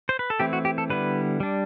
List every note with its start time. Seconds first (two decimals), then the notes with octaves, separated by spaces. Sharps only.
0.09 C5
0.19 B4
0.30 A4
0.40 E3 A3 C4 E4 G4
0.53 F#4
0.65 G4
0.78 A4
0.90 D3 G3 B3 E4 B4
1.40 G3 D4